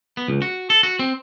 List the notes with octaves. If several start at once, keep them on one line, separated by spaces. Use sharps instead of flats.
B3
C#2
F#4
A4
F#4
C4